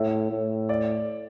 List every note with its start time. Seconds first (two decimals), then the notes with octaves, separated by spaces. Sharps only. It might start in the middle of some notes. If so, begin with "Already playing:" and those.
Already playing: A2 E5
0.31 A2
0.69 D5